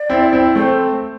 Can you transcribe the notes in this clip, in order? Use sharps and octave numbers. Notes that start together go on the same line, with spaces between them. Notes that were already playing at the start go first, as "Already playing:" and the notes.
Already playing: D5
C4 E4
C4 E4
A3 C4 C5